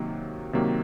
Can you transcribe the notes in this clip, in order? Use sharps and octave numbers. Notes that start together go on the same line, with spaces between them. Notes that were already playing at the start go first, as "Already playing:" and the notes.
Already playing: C3 D#3 F#3 A#3
C3 D#3 F#3 A#3